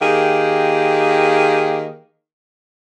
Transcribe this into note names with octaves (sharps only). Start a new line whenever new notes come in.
D#3 A#3 G4 G#4